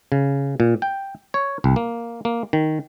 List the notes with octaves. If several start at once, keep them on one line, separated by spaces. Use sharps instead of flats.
C#3
A#2
G5
C#5
C2
A#3
A#3
D#3